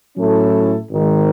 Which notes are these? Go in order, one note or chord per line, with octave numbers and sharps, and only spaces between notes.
A2 F#3 C#4 E4 A4
G#1 G#2 D#3